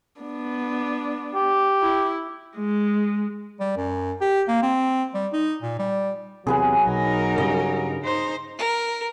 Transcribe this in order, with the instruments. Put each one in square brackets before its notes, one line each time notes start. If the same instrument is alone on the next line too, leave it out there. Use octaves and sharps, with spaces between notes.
[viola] B3 D4
[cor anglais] G4
[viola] E4
G#3
[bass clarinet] G3
F#2
G4
A#3
C4
G3
D#4
A#2
G3
[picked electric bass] E2 C3 [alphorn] F#3 [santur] G#4 B4 G#5
[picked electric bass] B1 [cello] D#4 A#4
[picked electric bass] G2 C#3 G3 [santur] D#5
[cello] D#4 C5
[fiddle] A#4